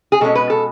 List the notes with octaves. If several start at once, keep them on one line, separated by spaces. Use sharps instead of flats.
G#4
B2 G#3 C#4 A4
B4
A4